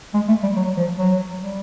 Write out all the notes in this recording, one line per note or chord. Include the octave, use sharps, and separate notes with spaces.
G#3
A3
G3
F#3
F3
F#3
G3